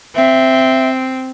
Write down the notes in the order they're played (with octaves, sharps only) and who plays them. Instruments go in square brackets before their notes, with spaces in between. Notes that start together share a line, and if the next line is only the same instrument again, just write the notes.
[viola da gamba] C4 [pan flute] E5